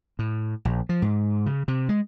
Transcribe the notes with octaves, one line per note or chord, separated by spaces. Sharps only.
A2
A#1
F3
G#2
C#3
C3
G#3